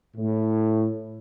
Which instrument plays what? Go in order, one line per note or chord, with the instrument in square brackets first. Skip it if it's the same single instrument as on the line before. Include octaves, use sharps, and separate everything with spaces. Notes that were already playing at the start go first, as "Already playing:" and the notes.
[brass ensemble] A2